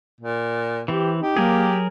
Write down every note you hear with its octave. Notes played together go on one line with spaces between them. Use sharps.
A#2
E3 C4 G4
D#4 G4
F#3 A#3 G#4 A#4